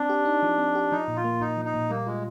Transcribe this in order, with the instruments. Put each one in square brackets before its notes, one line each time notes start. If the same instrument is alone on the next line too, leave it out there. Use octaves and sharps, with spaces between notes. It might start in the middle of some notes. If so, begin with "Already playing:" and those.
Already playing: [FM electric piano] C4 [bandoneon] D4
[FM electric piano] G4
D#4
F3
C4
G4
[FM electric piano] F3 [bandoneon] D#4
[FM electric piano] A#2
[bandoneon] F4
[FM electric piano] A#3
[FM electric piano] A#2 [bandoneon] D#4
[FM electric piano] F3
[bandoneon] D#4
[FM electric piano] A#2
[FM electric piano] G3 [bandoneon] A#3
[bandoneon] G#3 [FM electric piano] F4